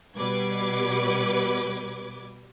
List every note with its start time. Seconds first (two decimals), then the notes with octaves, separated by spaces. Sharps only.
0.17 B2 G3 B4 D6 G#6